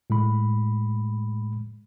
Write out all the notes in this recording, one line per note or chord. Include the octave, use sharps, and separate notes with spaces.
A2 G#3 B5